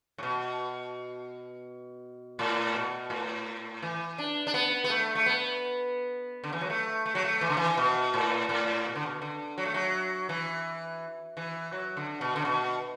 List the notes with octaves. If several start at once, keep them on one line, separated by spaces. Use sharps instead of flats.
A2
B2
A2
B2
A2
E3
D4
D4
B3
B3
A3
A3
B3
D3
E3
F#3
A3
A3
F#3
A3
E3
D3
E3
B2
A2
A2
B2
D3
B2
D3
F#3
A3
F#3
E3
E3
F#3
D3
B2
D3
B2